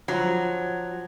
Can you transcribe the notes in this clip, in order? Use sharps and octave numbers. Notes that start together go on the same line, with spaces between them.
F3 F#3